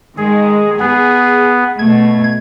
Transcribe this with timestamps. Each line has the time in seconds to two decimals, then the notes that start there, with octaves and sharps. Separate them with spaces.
0.18 D#3 G#3 G#4
0.80 B3 G#4
1.79 B2 A3 G#6